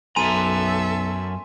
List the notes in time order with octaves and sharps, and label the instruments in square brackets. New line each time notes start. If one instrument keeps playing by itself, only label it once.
[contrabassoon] B1 [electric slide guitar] F#2 A#5 [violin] A4 E5 [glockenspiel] G#5 C6 D#7